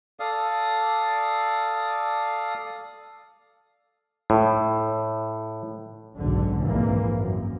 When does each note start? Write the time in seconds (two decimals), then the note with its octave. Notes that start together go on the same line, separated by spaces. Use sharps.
0.20 A4 D5 F5 D#6
4.30 A2
6.16 F#1 B1 G#2 D3
6.65 A#1 F2 G#2 E3 A#3
7.18 F#2